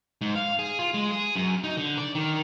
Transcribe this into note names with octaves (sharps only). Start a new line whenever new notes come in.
G#2
F5
G#4
F4
G#3
G#4
F#2
D#4
D3
D5
D#3